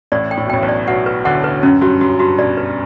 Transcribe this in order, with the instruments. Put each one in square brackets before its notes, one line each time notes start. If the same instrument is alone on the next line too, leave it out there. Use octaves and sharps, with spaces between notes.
[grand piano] A1 A2 [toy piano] D5
[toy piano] G5
[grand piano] A2
B2
[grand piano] A1 A2 [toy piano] G5
[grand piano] B1 B2
[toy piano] D5
[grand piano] B1 B2 [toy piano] F#5
[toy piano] B4
[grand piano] D2 D3 [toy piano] F#5
[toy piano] B4
[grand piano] F#2 [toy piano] C#4
[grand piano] G2 [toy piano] F#4
[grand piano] F#2 [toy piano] F#4
[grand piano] G2 [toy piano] F#4
[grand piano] B1 B2 [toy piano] D5
[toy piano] B4